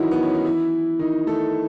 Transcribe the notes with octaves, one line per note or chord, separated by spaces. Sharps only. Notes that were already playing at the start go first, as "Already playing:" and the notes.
Already playing: D#3 E3 F#3 D#4 E4 F#4
B3
C#4
D#4
E3 E4
D#3 D#4
A3 A4